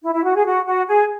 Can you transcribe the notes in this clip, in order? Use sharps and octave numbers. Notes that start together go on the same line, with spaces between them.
E4
E4
F#4
G#4
F#4
F#4
G#4